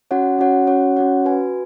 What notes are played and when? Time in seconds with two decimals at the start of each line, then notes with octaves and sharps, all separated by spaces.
0.11 C#4 F#4 C#5 F#5
0.39 C#4 F#4 C#5 F#5
0.67 C#4 F#4 C#5 F#5
0.96 C#4 F#4 C#5 F#5
1.24 F#4 B4 G#5